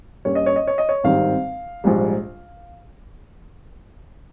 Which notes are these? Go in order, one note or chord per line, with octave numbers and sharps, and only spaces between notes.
G2 G3 A#3 C#4 C#5
D#5
C#5
D#5
C#5
D#5
C#5
G#1 G2 D#3 G3 C4 F5
A#1 G#2 G3